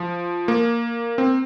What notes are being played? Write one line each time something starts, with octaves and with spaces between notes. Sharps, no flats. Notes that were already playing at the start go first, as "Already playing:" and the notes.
Already playing: F3
A#3
C4